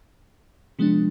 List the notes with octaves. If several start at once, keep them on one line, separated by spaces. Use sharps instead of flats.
C3 F3 G#3 B3 D4